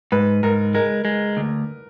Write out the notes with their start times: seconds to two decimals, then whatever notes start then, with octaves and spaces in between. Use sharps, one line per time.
0.12 G#2 B4
0.43 G#2 A#4
0.74 G#3 A#4
1.05 G#3
1.37 D2